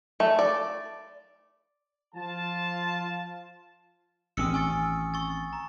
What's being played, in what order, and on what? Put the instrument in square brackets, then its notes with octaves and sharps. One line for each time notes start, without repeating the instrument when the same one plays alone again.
[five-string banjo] A3
D5
[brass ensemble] F3 F4 A5
[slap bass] A1 D#3 [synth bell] C4 C#4 E6 [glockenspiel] D#6 C#7
[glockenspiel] G#5 C#6 A6
C#6 A6
A#5